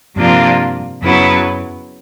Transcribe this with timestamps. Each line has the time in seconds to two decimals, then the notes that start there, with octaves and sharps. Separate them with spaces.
0.15 G2 C3 F3 A#3 D4 F4
1.02 F#2 C#3 F#3 B3 E4